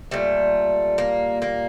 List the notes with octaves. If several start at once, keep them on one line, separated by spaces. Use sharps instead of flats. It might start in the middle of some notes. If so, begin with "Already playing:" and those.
A#2 G3 A3
A#3
A#3